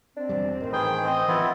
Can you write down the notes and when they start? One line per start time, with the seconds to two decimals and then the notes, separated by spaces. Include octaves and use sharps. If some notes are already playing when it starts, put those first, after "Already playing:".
0.17 C4 D4
0.29 E1 E2 G3
0.61 A1 A2 D#3
0.73 D#3 G#4 B4 C5 G5
1.04 C4 D#5
1.28 E3 F3 B3 C4 E4 F4